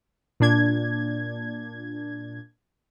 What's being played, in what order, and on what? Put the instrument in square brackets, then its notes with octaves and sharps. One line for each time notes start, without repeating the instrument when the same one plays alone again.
[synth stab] A#2 D4 G#6